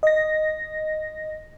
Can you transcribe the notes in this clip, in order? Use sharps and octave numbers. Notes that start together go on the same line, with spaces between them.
D#5 A#6